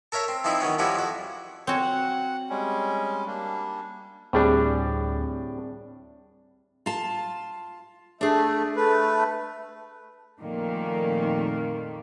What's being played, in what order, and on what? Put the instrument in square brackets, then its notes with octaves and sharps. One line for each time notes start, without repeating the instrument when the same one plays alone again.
[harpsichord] A4 A#4 C#5 E5
C4
E3 F3 C4 D#4 E4
D#3 F#3 B3 C#4
F3 G3 C#4 E4 F#4
F2 F#4
[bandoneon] F2 C#4 C#5 [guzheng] C4 F#4
[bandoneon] F#5
G3 G#3 C#4
G3 A#3 D4
[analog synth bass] D2 [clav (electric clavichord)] A2 G3 D4 [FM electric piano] C4 G#4 D5
[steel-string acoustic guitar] F4 A5
[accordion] A3 [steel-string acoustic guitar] D4 G#4
[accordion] A3 [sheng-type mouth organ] B4
[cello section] F2 A#2 D#3 A3 A#3